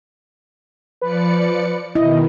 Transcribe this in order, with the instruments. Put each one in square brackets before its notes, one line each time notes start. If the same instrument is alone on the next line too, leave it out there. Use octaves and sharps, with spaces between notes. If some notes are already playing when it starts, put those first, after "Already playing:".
[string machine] F3 D5 C#7 [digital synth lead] B4
[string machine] B2 D#3 [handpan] E4 [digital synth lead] D#5